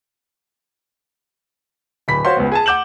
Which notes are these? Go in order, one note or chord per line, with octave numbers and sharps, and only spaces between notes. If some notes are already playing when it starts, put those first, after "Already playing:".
D1 B5 B6
F#4 C5 C#5 F5 C6
C#2 B3
G#4 G#5 A5
F#5 D6 G6 E7 F#7